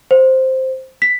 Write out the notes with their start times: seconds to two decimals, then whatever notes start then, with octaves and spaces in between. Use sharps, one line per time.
0.11 C5
1.02 B6